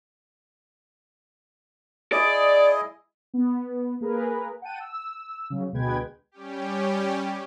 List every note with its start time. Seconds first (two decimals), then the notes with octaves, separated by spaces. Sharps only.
2.12 E4 G#4 D5 D#5
3.34 B3
4.01 A#3 G#4 A#4 B4
4.62 F#5 G5 A5 D#7
4.80 E6
5.50 C#3 F#3
5.73 D2 B2 G#3 B4 G5 G#6
6.32 G3 C#4 G4